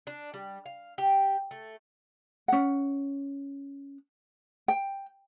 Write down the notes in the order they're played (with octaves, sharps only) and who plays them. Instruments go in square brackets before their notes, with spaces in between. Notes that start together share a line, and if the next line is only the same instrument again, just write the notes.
[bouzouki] D4
G3
F5
G4
A3
[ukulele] C#4 F#5
G5